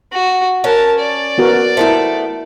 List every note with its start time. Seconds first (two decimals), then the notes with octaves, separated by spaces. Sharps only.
0.12 F#4
0.64 C#4 A#4 F#5 A5
1.00 D5
1.38 B3 F#4 A#4
1.77 A3 B3 E4 A4 A#4 C5